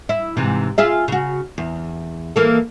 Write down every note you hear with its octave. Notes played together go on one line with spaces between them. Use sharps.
E4
G#2 C3 E3
F4 G#4 E5
C#3 F#4
E2
E3 A#3 A4